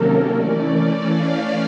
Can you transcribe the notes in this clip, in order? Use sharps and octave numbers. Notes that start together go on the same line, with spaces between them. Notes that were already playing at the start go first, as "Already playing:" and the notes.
Already playing: C3 D#3 F#3 A#3 C#4 A4 A#4
E3 A3 C#4 D5
F5